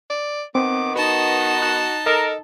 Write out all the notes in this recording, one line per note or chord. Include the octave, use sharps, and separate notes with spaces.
D5
D#3 B3 C4 D6
D#4 F#4 B4 A5
F#4 F#6
A4 A#4 D#5